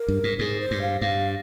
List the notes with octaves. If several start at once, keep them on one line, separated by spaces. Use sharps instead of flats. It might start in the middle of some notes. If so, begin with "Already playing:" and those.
Already playing: A#4
G2
G#2
G#2 G#4
C5
G2
F5
G2 F5